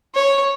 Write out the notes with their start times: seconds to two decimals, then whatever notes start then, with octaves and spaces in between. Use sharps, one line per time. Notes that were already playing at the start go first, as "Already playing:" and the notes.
0.15 C#5